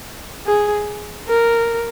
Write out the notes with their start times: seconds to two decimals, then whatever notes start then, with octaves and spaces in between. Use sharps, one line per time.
0.47 G#4
1.28 A#4